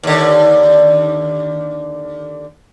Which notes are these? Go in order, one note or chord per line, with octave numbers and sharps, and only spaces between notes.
D#2 D3